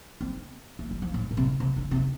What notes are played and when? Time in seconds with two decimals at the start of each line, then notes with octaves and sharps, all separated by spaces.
0.21 C4
0.79 A3
0.91 G3
1.02 F3
1.14 A2
1.31 A#2
1.37 C3
1.60 C3
1.76 D3
1.91 C3